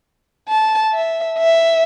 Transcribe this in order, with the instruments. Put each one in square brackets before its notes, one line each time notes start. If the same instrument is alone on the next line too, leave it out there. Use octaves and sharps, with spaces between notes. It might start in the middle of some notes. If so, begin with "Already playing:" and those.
[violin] A5
E5
E5